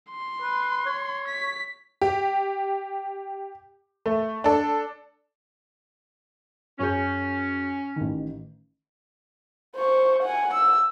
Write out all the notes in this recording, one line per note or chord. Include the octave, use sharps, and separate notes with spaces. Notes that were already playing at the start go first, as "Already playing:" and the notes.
C6
B4
C#5
B6
G4
A3
D4 A4
F#2 C#4 G#4 G6
A1 D#3
C5 C#6
F#5 G#5
E6